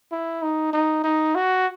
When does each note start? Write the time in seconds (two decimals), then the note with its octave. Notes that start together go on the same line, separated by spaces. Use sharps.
0.12 E4
0.42 D#4
0.73 D#4
1.04 D#4
1.35 F#4